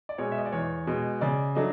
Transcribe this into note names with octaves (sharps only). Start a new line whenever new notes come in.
D5
B2 G#3 C#5
E5
D#5
D5
E2 C#5
B2 G#3
C#3 D5
F#3 A3 D4 D#5